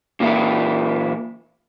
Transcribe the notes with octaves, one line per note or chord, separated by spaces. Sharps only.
A#2 E3 A#3 E4